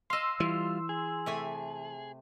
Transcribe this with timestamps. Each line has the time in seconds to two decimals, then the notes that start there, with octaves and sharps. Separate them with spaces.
0.10 D#5 F5 C6 E6
0.40 E3 G3 F4
0.89 G#4
1.26 C3 A3 G#5